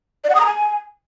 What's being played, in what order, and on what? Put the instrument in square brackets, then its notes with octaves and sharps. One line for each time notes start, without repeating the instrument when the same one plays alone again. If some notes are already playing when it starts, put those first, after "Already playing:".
[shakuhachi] D5
F#5
D#6
A#5
G#5